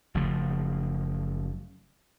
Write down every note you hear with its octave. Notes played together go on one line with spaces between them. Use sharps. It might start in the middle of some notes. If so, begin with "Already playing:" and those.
F#1 C#3 F3 A3